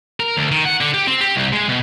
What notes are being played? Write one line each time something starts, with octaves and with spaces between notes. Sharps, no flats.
A#4
D2
D#3
F#5
D3
G4
C4
G4
C2
G#3
B2